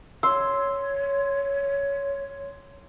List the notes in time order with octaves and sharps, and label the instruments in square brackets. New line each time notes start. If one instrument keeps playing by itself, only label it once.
[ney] C#5 [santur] C6 [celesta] E6